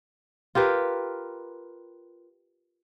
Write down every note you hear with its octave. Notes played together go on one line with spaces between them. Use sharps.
F4 G4 A#4 B4